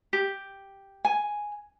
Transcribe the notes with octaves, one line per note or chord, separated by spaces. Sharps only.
G4
G#5